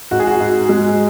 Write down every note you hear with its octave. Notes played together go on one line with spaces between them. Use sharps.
G#2 F#4
G#4
F#4
G#2
G#3